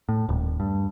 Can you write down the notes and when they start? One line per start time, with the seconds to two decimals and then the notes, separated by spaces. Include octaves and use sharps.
0.09 A2
0.29 D#1
0.60 G2